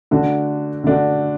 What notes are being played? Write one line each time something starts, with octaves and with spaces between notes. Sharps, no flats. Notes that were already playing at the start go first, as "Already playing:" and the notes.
D3 A3 D4 F#4
D3 A3 D4 F#4